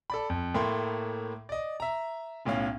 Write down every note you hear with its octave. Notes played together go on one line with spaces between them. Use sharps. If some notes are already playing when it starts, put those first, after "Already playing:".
A4 D5 B5
F2
A2 A3 A#3 G5 B5 C6
D5 D#5
E5 A#5
B1 A2 C#4 F5